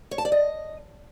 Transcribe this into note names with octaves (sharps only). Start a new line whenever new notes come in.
C#5
A5
D5
D#5